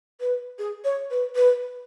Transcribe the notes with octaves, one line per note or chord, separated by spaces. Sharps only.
B4
G#4
C#5
B4
B4